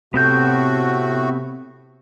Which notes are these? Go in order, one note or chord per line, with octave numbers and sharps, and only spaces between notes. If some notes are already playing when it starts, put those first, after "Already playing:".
A2 C3 A3 B3 C4 F#4 G6